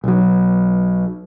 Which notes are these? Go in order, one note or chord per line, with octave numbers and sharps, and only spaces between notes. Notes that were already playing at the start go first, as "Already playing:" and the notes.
B1 F#3